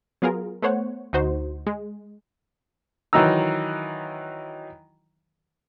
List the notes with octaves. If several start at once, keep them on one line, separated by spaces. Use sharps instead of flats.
F#3 B3 F4 G#4 A#4
A3 B3 C5 C#5 F#5
D2 D#4 F#4 C5
G#3
D#3 E3 F#3 D#4 A#5 E6